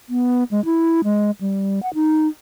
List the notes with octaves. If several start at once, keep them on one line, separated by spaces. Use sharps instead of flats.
B3
G#3
E4
G#3
G3
F#5
D#4